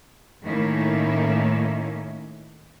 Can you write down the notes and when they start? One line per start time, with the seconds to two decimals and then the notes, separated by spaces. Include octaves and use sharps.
0.43 A2 D#3 A#3 C#4 E4